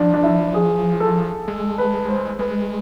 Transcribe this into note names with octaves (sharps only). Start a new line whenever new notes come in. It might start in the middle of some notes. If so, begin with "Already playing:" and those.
Already playing: F3 D4
D4
E4
G#4
A4
G#3
B4
C5
G#3 B4